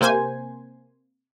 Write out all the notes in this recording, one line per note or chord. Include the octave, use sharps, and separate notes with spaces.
C3 A#3 C5 G#5